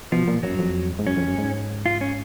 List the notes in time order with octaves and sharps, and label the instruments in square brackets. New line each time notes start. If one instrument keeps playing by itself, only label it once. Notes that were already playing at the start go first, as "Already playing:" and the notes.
[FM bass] B2 [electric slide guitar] F3
[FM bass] A#2
[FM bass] F#2 [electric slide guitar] F#3
[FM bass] F2
G#2
[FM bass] F#2 [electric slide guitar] C#4
[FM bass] F2
F#2
G#2
[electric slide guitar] F4
C#4